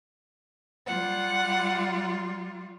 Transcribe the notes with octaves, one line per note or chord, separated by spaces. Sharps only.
G3 F4 F#5